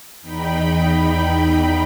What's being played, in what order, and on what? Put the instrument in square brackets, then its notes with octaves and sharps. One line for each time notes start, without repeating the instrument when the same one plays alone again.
[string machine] E2 D#4 G5 B5